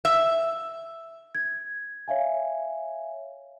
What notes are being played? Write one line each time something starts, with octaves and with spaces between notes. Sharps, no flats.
E5
G#6
C#5 E5 F5 G#5